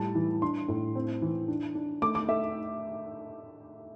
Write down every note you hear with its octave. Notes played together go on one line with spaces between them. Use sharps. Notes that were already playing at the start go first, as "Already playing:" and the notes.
Already playing: A2 G3 A5
E3
D4 C6
A2
C4
E3
D4
D4
A3 D6
D6
A3 E5